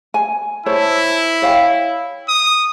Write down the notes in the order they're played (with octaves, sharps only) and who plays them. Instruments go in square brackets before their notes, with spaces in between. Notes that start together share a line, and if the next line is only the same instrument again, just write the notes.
[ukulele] G#5
[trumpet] E4 [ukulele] C5 C#5 A5
[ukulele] C#5 F5 G5
[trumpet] D#6